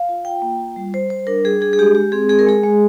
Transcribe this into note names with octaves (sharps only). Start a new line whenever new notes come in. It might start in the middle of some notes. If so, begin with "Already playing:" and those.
Already playing: F5
F4
F4 G5
A#3
F4
G3
G3 C5
G3 C5
D4 A#4
G3 G#4
D4 G#4
G#4
G#3 G4
G#3 G4
C4 G#4
G#3 G#4
A#4
G#3 G#4
G#3